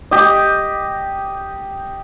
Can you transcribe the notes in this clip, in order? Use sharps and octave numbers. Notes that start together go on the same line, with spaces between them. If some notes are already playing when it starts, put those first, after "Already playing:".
G4 D#5